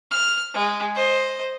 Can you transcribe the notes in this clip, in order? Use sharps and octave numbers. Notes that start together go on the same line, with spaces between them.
F6
G#3
C5 D#5